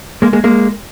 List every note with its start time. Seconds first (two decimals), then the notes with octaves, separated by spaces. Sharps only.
0.22 G#3 A#3
0.33 G#3 A#3
0.44 G#3 A#3